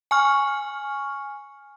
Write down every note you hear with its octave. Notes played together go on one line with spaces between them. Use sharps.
G#5 C#6 F6